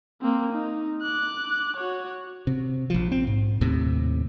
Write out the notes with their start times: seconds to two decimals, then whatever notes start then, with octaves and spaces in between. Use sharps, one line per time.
0.21 A#3 C4
0.52 D#4
1.02 D6 F#6
1.76 F#4 C#5
2.47 C3
2.90 A#1 F3
3.12 C4
3.27 G#2
3.61 D#2 A2 C3